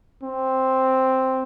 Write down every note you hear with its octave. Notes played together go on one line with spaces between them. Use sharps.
C4